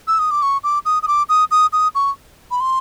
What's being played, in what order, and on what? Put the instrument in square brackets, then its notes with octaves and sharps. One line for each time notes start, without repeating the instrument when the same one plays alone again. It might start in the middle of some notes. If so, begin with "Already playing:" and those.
[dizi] E6
D#6
D6
C#6
D6
D#6
D#6
D6
D#6
D#6
D#6
C#6
B5
C6